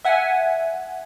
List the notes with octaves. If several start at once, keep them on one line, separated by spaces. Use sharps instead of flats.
E5 F#5 G#5